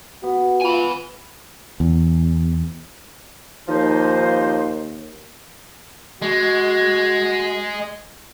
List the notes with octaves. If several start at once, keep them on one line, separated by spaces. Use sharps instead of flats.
B3 F#4
F4 G#5 B5
E2
D#2 F3 D#4 C5
G#3 F#4